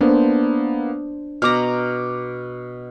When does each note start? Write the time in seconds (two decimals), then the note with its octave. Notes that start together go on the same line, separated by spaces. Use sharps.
0.01 A#3 B3 D4 C5
1.42 B2 A#5 D6 F6